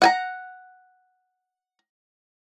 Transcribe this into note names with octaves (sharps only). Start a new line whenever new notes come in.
F#5 G#5 A#5